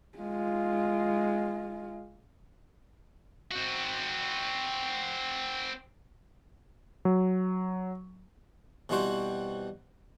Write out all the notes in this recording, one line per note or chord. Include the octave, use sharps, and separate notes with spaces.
G#3 F4
C4 F#4
F#3
B2 E3 G3 C4 F#4 C5